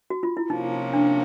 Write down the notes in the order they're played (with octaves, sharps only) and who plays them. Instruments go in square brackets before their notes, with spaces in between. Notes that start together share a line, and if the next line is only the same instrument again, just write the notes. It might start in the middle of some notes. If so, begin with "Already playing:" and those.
[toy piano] F#4
F4
E4
[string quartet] C3 F3 A#3 C#4 [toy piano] D#4
[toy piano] D4